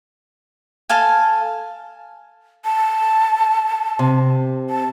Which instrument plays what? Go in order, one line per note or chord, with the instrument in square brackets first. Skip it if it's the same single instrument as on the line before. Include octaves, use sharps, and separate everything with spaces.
[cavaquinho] A4 F5 G#5
[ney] A5
[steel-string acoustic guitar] C3
[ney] A5